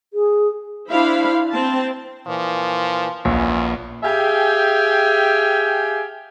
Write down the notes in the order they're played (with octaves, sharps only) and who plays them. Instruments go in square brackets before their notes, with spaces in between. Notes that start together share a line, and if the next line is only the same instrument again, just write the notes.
[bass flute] G#4
[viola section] D4 E4 C5 F5 B5
C4 A5
[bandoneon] A#2 E3 [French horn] F3
[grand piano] A#1 [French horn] E2 [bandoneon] C#4
[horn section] G4 G#4 E5 F5 G5 G#5